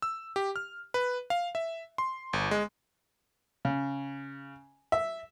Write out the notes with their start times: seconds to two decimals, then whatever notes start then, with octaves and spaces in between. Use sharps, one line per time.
0.02 E6
0.36 G4
0.56 F6
0.94 B4
1.30 F5
1.55 E5
1.98 C6
2.33 G1
2.51 G#3
3.65 C#3
4.92 E5